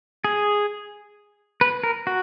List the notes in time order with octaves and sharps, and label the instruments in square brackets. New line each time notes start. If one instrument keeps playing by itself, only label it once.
[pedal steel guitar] G#4
B4
A#4
F#4